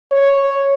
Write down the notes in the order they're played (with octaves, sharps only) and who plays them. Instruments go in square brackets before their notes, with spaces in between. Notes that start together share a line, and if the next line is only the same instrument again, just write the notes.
[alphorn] C#5